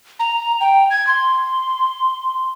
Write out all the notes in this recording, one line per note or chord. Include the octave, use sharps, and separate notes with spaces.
A#5
G5
G#6
C6